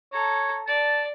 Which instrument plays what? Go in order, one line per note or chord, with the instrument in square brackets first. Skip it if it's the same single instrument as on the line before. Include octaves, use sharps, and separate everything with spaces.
[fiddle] A4 A#5 [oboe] C#5
[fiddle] D5 [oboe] A5